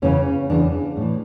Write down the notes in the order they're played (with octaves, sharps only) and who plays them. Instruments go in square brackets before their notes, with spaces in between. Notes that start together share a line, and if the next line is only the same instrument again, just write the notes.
[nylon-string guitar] E2 C#3 E3 C#4
E2 C#3 E3 D4
A2 E3